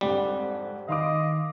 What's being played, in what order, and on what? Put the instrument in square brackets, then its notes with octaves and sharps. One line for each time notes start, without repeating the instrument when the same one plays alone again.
[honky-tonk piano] F2 G#2 D3 [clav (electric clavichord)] G3
[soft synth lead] D#3 [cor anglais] D#5 [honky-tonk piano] F5 C6 D6